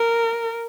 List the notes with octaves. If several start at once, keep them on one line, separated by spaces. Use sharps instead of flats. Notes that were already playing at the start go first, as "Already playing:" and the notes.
Already playing: A#4